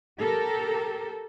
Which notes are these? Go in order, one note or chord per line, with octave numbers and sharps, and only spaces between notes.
G4 A4 A#4